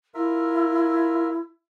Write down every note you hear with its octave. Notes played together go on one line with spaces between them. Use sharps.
E4 F4 A#4 E5